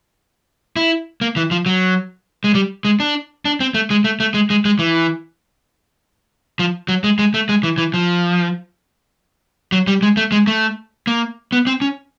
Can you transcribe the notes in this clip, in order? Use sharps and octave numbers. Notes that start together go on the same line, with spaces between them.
E4
A#3
E3
F3
F#3
G#3
G3
G#3
D4
D4
C4
A3
G#3
A3
A3
G#3
G#3
G#3
E3
F3
F#3
G#3
G#3
A3
G#3
E3
E3
F3
F#3
G3
G#3
A3
G#3
A3
A#3
B3
C4
C#4